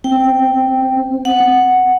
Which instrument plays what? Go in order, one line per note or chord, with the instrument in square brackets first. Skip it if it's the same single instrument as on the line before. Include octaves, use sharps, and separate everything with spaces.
[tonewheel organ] C4 [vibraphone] G5
[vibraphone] F#5